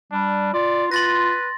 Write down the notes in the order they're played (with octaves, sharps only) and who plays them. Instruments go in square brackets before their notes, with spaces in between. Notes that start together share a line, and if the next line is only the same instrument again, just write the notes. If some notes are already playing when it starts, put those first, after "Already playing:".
[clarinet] G3 [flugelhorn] D4
[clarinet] F4 [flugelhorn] D5
[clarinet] F4 [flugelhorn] B4 [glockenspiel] C6 A6 A#6